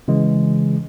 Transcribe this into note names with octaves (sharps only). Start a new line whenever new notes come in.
C#3 E3 G#3